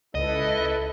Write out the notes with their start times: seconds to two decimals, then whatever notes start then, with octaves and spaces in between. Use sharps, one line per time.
0.15 C#2 E4 A4 B4 D#5